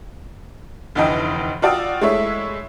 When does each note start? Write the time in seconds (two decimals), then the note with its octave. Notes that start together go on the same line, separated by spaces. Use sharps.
0.95 F1 D2 E3 D#4 D#5 G5
1.62 F4 F#4 D5 G5 D#6 E6
2.01 G#3 A3 E4 C#5 E5